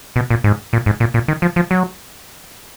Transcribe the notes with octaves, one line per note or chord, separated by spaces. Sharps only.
B2
A#2
G#2
A#2
G#2
A#2
A#2
D#3
F3
F3
F#3